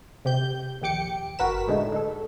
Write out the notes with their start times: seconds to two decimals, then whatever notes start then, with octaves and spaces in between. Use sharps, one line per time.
0.25 C3 G4 G6
0.82 A#1 D#2 G4 G5 D6 C#7
1.39 G1 F#4 A#4 B4 B6 E7
1.67 A2 D3 G#3 A3 D4 D#4
1.92 G#3 A4